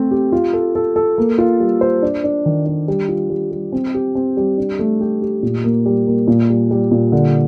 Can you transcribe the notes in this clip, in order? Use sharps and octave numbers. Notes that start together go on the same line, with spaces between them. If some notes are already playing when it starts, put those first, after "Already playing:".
Already playing: A3 C4 C5
G4
F4
A4
A4
A4
A#3
F4
G3
C5
D4
D4
D#3
D4
G3
F4
G3
G3
C4
G4
C4
G3
D4
A3
G4
G4
A#2
A#3
G3
A#3
A#2
G3
G3
A#2
D3